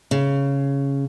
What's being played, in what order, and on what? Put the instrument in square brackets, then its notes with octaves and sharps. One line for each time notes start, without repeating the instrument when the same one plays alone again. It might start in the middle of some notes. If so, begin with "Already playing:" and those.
[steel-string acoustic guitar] C#3